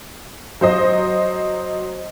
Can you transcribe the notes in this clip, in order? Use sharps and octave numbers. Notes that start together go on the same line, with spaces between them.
F#3 C5 D#5